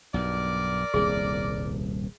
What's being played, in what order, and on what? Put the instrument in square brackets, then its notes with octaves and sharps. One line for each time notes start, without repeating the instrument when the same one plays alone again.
[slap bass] B1 G2 [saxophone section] A#4 D5
[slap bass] D#1 C2 F2 [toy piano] G#4